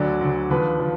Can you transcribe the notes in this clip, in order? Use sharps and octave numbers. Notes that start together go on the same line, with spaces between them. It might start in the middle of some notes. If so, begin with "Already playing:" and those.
Already playing: D2 D3 F#3 D5
D2 D3 F#3
D#2 D3 F3 B4
D3 F3